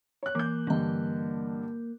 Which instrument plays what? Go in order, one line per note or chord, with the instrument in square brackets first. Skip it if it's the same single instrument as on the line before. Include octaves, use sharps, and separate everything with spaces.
[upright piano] C#5 F#6
[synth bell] E3 [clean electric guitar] A#3 [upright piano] D6 G6
[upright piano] G2 D3 [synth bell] E3 D#5